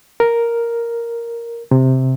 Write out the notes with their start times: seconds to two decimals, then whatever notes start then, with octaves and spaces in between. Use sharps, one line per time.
0.20 A#4
1.71 C3